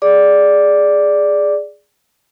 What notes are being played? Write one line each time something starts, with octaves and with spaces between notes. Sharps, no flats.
G#4 D5 D6